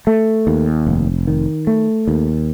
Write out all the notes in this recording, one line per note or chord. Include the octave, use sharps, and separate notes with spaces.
A3
D#2
F1
D#3
A3
D#2